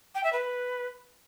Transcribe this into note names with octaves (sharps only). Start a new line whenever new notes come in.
G5
E5
B4